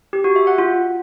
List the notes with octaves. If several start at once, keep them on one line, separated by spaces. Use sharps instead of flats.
G4
F#4
E5
F#5
F4